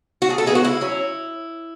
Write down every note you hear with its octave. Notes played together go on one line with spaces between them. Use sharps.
F#4
A2 G#4
A4
G#3 B3 G#4
F#4
C#3 E4
F#3 C#4